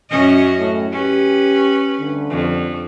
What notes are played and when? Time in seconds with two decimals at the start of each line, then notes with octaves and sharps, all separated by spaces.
0.10 F#2 C#4 D#5
0.59 A2
0.92 C#4 G4 B4
1.99 D2 G2 D3
2.30 F2